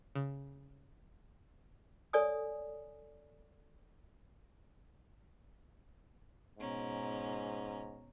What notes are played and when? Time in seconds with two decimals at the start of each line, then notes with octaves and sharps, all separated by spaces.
0.15 C#3
2.13 A4 C#5 D5 G#5 D#6
6.58 G#2 B2 C#4 A#5